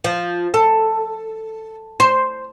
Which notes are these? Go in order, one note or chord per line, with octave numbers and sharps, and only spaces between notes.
F3
A4
C5